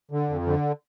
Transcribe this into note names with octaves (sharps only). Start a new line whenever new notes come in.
D3
F2
D3